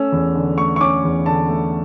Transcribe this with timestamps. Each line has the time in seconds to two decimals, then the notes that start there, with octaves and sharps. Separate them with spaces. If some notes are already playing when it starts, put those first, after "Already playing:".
Already playing: A3 C#4 E6
0.12 E2
0.35 D3
0.58 A3 C#6
0.76 C#6
0.81 C#4 D6
1.04 E2
1.26 D3 A5
1.49 A3